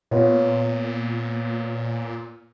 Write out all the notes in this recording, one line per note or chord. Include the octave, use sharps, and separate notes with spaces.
A#2 B3 F4 C#5